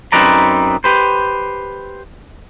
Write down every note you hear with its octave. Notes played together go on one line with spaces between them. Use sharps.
F#2 C4 D#4 B4 D5 A#5
G4 B4 C5